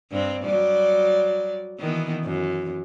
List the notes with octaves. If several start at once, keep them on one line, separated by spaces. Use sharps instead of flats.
G2 C4
F#3 G3 D5
D#3 E3 B3
F#2